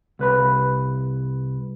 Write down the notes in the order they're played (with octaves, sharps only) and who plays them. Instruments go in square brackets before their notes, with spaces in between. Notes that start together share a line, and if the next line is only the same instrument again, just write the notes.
[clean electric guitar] C2 B4 B5